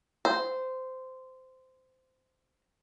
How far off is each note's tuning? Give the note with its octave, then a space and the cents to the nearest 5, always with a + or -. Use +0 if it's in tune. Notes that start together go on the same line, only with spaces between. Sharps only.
C5 -15